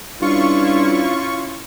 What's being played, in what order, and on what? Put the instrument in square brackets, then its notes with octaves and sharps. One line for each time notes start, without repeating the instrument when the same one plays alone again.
[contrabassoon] G2 [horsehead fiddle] C#4 E4 [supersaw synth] F4 C#6